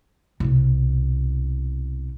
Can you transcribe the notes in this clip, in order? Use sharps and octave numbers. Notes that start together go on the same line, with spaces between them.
C2 B2